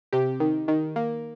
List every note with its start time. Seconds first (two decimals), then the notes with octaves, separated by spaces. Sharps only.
0.13 C3 G4
0.40 D#3
0.68 D#3
0.96 A#3